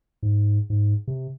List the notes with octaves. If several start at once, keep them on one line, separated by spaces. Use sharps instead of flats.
G#2
G#2
C3